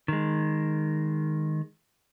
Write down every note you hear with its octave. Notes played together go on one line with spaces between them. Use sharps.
D#3 G#3